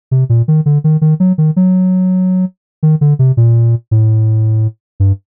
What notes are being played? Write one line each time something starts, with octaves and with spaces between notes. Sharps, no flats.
C3
A#2
D#3
D3
D#3
D#3
F#3
D#3
F#3
D#3
D3
C3
A#2
A2
G2